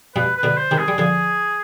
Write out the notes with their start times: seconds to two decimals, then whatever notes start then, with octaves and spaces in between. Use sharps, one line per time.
0.16 G2 B2 B4
0.36 B4
0.43 B2 D3
0.57 C5
0.71 C3 D#3
0.79 G#4
0.88 G3
0.98 D3 F3 G#4